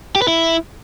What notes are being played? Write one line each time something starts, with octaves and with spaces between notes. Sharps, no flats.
G4
B4
E4